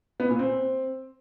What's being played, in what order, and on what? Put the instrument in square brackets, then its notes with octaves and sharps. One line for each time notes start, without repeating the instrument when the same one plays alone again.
[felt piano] B3
A#2
C4